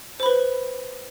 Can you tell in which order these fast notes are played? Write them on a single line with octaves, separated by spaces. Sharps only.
C5 B5 B4